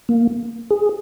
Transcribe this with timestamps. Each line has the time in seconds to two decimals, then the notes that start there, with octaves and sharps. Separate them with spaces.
0.09 A#3
0.71 G#4